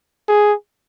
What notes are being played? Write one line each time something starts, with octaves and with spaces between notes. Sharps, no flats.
G#4